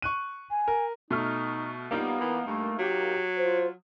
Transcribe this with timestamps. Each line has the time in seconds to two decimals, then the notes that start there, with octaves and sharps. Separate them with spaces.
0.02 C#6 F#6 D#7
0.51 G#5
0.68 A#4
1.11 B2 A3 D#4 F6
1.91 G3 A#3 B3 D#4 F4
2.21 E3
2.47 G2 A3
2.79 F#3 G4
3.38 F4 C5